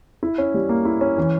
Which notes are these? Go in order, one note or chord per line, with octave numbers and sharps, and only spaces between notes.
E4
C#4
G3
A#3
E4
C#4
E3